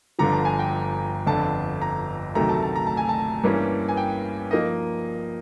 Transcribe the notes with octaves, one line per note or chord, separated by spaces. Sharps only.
G1 G2 D3 F3 A#5
A5
G#5
G5
G1 F2 D3 A5
A#5
D2 C3 D#3 F#3 A3 A#5
A5
A5
A#5
A5
G#5
A5
G2 E3 G3 A#3 C#4
G#5
G5
F3 A#3 D#4 D#5